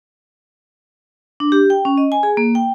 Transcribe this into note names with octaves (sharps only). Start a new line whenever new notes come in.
D4
G4
G5
C#4
D#5
G#5
G#4
A#3
G5